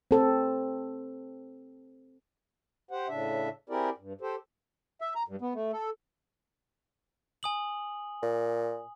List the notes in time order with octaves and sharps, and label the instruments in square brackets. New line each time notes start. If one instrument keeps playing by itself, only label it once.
[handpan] C4 A4
[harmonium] G4 C5 F#5
A2 C#3 D4 E5
C4 E4 G4 G#4 A#4 D5
G2
G4 A4 C5
E5
A#5
G2
B3
A3
A4
[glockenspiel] G#5 D#6 F#7
[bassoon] A#2